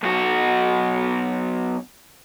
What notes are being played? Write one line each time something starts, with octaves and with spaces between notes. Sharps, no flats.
B1 F#4